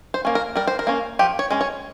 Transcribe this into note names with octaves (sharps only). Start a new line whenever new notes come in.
C5
A#3 C#4
A#4
G3 A#4
C5
A#4
A#3 C#4
F3 G4
C#5
G#3 C#4
C#5